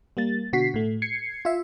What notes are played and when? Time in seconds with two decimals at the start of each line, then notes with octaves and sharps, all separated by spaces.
0.17 G3 A#3 A6
0.53 B2 D3 F#4 B6 C7
0.74 A2 A3
1.02 G#6 C7 C#7
1.45 F4 E5